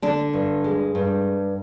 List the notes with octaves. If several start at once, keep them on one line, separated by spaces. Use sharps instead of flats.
D3 D4
G2
G#3
G2